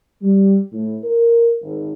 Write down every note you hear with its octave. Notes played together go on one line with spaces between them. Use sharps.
G3
A2
A#4
G#1